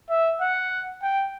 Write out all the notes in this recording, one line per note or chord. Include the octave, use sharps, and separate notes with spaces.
E5
F#5
G5